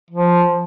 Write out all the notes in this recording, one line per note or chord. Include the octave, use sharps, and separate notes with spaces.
F3